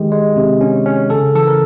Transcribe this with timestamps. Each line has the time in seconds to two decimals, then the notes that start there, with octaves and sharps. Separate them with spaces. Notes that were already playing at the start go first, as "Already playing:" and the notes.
Already playing: D#3 G#3 G4
0.12 G#3
0.36 C3
0.61 C#4
0.86 C#4
1.10 C#3 A4
1.35 E3 A4
1.47 A#4